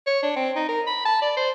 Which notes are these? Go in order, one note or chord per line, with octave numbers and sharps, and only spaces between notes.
C#5
D4
C4
D#4
A#4
B5
A5
D5
C5